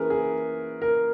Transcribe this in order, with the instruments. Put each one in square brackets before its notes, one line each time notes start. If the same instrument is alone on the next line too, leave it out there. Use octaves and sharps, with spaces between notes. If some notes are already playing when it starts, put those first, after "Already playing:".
Already playing: [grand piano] E3 A#3 C#4 G#4 A#4 B4
G#4
A#4